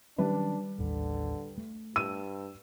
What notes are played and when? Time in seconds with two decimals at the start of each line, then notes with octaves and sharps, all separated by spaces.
0.18 D#3 F#3 G3 C#4 D4 B4
0.78 A1 D#2 D3
1.58 A3
1.96 G2 E6 D#7